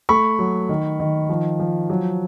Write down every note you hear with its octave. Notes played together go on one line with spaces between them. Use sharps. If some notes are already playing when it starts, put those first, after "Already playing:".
A3 B5 C#6
F#3
D#3
D#3
F3
F3
F#3